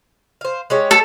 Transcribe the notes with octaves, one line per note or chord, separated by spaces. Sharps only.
C5 F5
G#3 G4 C#5
A4